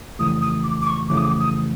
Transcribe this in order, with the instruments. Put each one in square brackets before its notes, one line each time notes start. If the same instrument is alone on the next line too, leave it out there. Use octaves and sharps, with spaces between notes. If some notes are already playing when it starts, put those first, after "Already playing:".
[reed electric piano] F2 C#3 E3 A3 [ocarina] D#6
[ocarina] D#6
D6
D6
C#6
[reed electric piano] F2 C#3 E3 A3 [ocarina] D6
[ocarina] D#6
D6
D#6